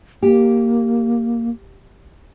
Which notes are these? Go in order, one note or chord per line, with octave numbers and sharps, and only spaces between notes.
A#3 G4